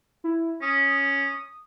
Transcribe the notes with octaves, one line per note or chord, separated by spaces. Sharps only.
E4
C#4 D#6